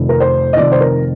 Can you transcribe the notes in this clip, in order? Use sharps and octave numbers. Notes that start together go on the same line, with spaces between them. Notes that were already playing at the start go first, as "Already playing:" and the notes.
Already playing: F1 F2 D#3
A#4
C5
D#5
F1 F2 D#3 D5
C5
A#4